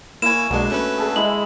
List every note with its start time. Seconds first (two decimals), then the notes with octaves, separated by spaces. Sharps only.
0.22 A#3 E4 C#5 G#5 E7
0.50 B1 F#3 G#3 A#3 D4
0.70 A3 C#4 B4
0.98 G#4 A4 E5
1.16 G#3 E4 D#5 E5 B5 F#7